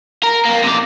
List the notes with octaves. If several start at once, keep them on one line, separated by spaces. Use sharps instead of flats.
A#4
F2 A#3
C3 D5